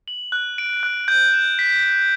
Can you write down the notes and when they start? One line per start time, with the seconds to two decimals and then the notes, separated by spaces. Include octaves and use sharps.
0.08 F#7
0.32 F#6
0.58 D7
0.83 F#6
1.08 G6
1.33 E7
1.59 B6
1.84 B6